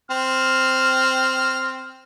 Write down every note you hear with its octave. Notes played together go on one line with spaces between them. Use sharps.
C4 F6